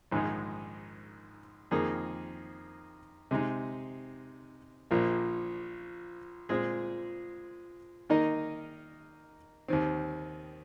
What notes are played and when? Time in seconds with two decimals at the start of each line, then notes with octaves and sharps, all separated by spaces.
0.11 A#1 G#2 D#3 G#3 D#4
1.71 F2 D#3 A#3 D#4 G#4
3.31 C3 G#3 D#4
4.91 A#1 A#2 F3 A#3
6.49 A#2 G#3 C4 G#4
8.10 D#3 A#3 D#4 A#4 D#5
9.68 D#2 D#3 C4